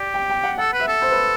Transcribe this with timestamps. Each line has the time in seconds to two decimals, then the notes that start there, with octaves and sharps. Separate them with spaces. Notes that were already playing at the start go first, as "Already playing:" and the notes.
Already playing: G4 D5
0.14 G5
0.30 G5
0.44 F#5
0.58 A4 F#5
0.73 B4
0.80 E5
0.88 A4
1.02 C5
1.12 B4